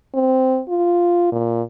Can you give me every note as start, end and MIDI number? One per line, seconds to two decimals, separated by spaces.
0.15 0.61 60
0.68 1.28 65
1.32 1.62 46